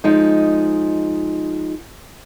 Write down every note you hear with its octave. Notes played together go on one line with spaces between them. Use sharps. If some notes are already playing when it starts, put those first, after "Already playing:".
F3 G#3 D#4